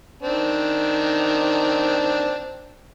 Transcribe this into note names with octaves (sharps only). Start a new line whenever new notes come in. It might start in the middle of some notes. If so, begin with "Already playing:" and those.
D#3 C4 D4